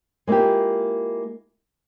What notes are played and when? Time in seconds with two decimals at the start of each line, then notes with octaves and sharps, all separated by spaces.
0.27 G#3 A#3 E4 F4 G4